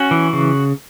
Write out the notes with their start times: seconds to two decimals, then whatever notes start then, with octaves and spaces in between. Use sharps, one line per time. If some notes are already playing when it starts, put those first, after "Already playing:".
Already playing: C#4 F#4
0.11 E3
0.33 C#3